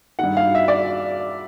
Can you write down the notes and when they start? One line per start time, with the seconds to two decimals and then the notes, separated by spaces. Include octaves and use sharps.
0.19 G2 D#3 F#5
0.37 F5
0.55 E5
0.68 D5